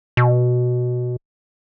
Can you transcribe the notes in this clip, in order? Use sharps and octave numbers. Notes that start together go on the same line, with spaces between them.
B2